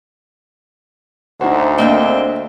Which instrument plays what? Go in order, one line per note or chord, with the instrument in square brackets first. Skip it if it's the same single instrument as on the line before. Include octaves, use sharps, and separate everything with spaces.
[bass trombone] D2 [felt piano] D#4 C5 [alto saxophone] F#4
[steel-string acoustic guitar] A3 A#3 G5 [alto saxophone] C4 [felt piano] D4 D#5